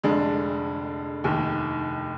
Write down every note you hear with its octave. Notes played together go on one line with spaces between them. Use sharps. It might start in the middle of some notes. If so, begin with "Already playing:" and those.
F1 F2 D3 G#3 D4
F1 D#2 D#3